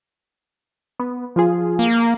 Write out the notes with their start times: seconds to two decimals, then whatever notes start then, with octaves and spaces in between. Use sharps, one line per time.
1.00 B3
1.36 F3 F4 G#4
1.79 A#3